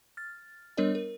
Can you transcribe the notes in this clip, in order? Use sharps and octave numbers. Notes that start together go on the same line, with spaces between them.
F6 A6
G3 B3 D4 A#4 C#5 D#5
A#4